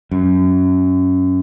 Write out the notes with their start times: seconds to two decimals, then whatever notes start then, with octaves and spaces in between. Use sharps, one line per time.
0.11 F#2